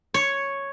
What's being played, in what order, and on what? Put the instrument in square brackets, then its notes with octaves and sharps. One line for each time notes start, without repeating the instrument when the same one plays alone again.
[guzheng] C#5